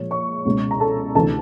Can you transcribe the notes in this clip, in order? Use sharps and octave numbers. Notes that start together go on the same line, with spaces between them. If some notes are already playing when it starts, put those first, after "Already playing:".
Already playing: A#2 F3 G#3 C#5
C#5 C#6
C#2 B2 G#3
A#5
A4 A5
D2 C3 E3 A4 A5